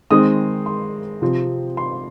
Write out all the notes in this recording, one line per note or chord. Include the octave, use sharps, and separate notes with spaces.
D#3 G#3 C4 D#6
C6
C3 F3 C4
C6